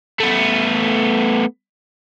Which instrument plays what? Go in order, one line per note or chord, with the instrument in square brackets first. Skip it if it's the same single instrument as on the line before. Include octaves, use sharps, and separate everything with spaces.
[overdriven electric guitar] A3 B3